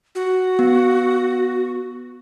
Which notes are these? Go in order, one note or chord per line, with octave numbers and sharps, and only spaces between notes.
F#4
B3